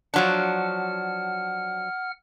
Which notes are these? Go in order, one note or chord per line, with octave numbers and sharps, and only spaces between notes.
F3 F#3 D4 F#5 F6